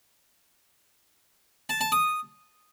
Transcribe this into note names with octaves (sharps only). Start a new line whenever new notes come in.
A5
A5
D#6